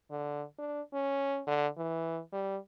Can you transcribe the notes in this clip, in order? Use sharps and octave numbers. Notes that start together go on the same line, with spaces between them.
D3
D4
C#4
D3
E3
G3